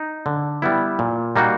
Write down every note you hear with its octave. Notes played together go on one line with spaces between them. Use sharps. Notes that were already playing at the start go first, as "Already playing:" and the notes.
Already playing: D#4
D3
G3 B3 E4
A#2
G3 A#3 D#4 F#4